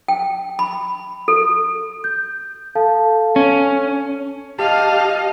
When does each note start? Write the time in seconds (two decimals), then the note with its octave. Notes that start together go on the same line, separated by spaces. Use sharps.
0.08 G5
0.59 B5
1.28 A4
2.04 G6
2.75 A4 F5 A5
3.36 C#4
4.59 G4 D#5 F5 A5